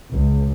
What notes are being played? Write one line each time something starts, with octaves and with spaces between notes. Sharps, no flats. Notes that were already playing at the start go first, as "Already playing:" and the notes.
C#2